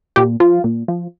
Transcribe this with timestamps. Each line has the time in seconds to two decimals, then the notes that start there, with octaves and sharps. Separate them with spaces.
0.16 A#2 G4
0.40 F3 F4
0.64 A#2
0.88 F3